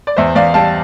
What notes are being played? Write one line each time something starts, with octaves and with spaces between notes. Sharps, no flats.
D5
E2 C5 E5
E2 D5 F5
G3 F5 A5